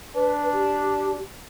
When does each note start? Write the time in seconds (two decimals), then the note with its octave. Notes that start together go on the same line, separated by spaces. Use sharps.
0.15 D4 B4
0.54 G4